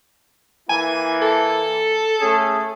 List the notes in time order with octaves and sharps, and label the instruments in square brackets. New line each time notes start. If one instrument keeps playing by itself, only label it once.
[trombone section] E3 A#3 E4 [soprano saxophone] G#5
[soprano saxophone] A4
[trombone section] A3 C#4 G#4